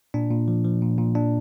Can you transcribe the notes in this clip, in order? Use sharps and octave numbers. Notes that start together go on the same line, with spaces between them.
A#2 D4
A#2
F3
F3
A#2
A#2
A#2 D4